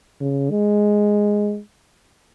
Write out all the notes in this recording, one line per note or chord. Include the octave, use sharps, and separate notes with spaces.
C#3
G#3